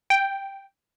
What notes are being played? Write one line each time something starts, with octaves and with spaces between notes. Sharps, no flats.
G5